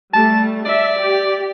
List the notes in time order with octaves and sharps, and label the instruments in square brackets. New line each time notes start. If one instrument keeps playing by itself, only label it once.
[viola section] G3 A3 [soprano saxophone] A5
[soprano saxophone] D5 [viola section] E5
[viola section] G4